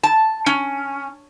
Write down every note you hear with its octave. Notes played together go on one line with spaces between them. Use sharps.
A5
C#4